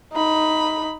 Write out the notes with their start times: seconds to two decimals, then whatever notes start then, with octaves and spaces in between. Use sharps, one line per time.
0.13 D#4 B5